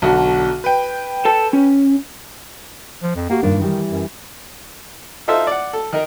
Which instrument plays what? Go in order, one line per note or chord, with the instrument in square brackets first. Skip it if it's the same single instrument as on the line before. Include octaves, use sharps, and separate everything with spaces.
[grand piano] B1 D3 F#4
B4 G5
[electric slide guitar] A4 A5
C#4
[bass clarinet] F3
F2
[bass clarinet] A#3 [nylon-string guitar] F#4 G4 F#5
[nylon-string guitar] G2 A#2 D#3 [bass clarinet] D4
[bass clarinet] D#3 [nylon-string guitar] E3 G3
[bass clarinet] F#2
[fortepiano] D#4 F4 A4 C5 E5
D5 F#5
A4
D#3 D#4 A#4